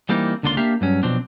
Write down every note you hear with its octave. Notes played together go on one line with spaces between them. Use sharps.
E3 G3 A#3 C4 D#4
C#2 D3 A#3 D4 F4 C6
A#3 D4 G4 E5 F5
G2 F#3 C#4
B2 F3 F#3 C4 D4